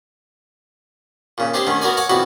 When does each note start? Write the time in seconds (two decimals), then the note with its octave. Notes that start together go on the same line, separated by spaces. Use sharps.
1.38 A#2 C#3
1.54 C4 D4 G4 G#4 C5
1.67 D3 D#3 A3 C#4
1.82 B3 F#4 A#4 D5 G#5
1.97 C#5 F#5 G#5 C#6 D6
2.10 F2 B2 E4 F#4 D5